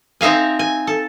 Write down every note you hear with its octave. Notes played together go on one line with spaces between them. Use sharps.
C4 D#4 E5 F5 G#5
G#5
A4